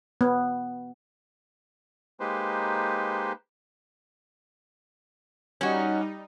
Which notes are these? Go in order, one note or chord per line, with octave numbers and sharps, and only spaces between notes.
B3
G#3 A#3 D#4 G4 B4 C5
G3 C#4 D#4 F#4